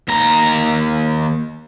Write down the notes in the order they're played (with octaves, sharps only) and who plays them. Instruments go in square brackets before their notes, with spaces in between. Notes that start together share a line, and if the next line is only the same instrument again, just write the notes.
[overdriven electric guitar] D#2 A#5